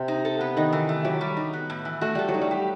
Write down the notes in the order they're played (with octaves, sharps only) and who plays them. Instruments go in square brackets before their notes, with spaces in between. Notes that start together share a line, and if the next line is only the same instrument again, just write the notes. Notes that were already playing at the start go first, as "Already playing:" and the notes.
Already playing: [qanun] C3
[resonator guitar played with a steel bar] D#4
A4
B3
[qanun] D#3 [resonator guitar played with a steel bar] D#4
[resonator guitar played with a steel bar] E3
A3
[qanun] F#3 [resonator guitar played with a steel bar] G4
[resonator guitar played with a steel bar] G3
D#4
B3
A2
E3
[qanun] A3 [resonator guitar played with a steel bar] F#4
[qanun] G3 [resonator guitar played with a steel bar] A4
[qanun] F#3
[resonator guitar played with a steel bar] D#4
[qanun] G3
[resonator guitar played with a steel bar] G4